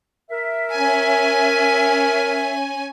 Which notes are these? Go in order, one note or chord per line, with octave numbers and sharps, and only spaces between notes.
A#4 E5
C#4 G#5